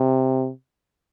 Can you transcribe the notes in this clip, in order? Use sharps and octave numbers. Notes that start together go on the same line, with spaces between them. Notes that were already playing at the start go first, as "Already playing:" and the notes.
Already playing: C3